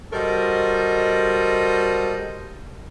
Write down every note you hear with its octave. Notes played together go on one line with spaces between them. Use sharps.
G3 F#4 A4 A#4 C5 D#5